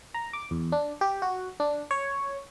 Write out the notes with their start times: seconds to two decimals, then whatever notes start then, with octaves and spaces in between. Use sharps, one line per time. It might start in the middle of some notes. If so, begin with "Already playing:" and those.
0.14 A#5
0.33 D6
0.51 E2
0.72 D4
1.01 G4
1.22 F#4
1.60 D4
1.91 C#5